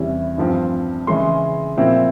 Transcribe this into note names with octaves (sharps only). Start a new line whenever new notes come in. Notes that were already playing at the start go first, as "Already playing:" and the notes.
Already playing: E2 C3 G3 C#4 E4
G2 F3 C4
C#3 E3 G#3 C#4 C6
A#2 F3 C4 E4